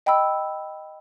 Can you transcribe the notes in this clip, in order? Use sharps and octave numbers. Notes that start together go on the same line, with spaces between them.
D#5 G5 B5 E6